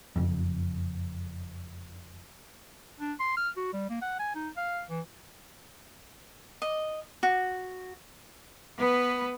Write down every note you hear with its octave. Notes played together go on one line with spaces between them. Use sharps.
F#1 F2
D4
C6
F6
F#4
G3
A#3
F#5
G#5
D#4
F5
E3
D#5
F#4
B3 B4